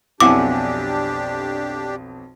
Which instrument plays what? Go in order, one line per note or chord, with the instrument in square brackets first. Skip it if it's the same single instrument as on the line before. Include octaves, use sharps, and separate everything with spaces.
[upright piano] B1 F2 [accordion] D4 G4 [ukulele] E4 F#5 G#5 [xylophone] D6